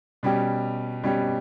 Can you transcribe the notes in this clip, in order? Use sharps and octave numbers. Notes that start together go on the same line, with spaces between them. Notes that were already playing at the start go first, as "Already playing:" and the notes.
B2 G3 C#4 G4
B2 G3 C#4 G4